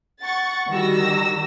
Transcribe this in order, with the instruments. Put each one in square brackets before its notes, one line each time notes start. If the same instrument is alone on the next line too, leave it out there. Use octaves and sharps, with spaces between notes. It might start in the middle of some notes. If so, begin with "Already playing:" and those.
[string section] F#5 C#6 A6
D3 D#3 G3 F#4 E6 A#6